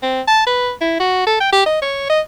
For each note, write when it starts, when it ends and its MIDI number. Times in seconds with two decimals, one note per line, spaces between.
0.02 0.21 60
0.27 0.43 81
0.47 0.71 71
0.81 0.95 64
1.00 1.26 66
1.27 1.37 69
1.40 1.49 79
1.52 1.66 67
1.66 1.81 75
1.82 2.09 73
2.10 2.21 75